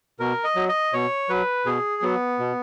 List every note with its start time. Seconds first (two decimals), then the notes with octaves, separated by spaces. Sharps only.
0.20 B2 A#4
0.44 D#5
0.56 F#3
0.69 D#5
0.93 B2 C#5
1.29 F#3 B4
1.66 B2 G#4
2.02 F#3 B3
2.39 B2